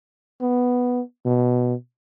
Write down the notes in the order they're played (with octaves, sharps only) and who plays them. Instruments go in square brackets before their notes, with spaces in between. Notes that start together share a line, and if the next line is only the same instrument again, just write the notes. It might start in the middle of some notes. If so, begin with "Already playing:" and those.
[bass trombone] B3
B2